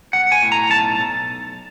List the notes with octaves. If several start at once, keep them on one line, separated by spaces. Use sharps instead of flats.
B1 F#5
G#5
A2
A#5
B1 A5
B1